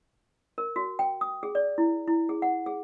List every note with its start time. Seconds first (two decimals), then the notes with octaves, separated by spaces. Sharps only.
0.58 A#4
0.76 F#4
0.99 G5
1.21 D#6
1.43 G#4
1.55 D5
1.78 E4
2.07 E4
2.29 G#4
2.42 F#5
2.66 G#4